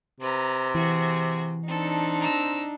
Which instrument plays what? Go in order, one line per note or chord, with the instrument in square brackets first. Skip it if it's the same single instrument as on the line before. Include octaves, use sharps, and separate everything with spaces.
[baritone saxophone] C3 [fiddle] B4 A#5
[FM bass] E3 [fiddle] F#4 G#4
[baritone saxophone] C4 [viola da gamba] D4 D#4 [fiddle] A4
[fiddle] A#5 E6